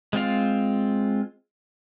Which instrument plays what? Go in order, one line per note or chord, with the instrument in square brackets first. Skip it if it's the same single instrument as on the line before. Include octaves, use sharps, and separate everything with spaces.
[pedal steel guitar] G#3 C4 F4 F5